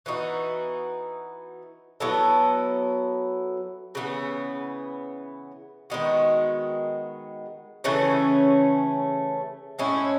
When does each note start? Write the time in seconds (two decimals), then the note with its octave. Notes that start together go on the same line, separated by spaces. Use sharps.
0.06 E3 B3 D#4 F#4
2.00 F#3 B3 E4 A4
3.95 C#3 E3 B3
5.90 D#3 G#3 B3 F#4
7.84 C#3 E3 A3 C#4
9.79 A2 G#3 C#4 E4